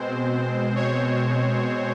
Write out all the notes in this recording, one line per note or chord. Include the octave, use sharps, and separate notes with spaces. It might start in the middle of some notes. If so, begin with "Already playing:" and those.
Already playing: B2 G#3 C4 C5
C#5